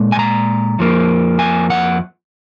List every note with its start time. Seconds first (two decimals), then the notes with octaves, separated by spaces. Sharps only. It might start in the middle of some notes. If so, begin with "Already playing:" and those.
Already playing: A#2 G#3
0.12 G#5
0.19 A#5
0.79 F2 F3 A#3
1.39 G#5
1.70 F#5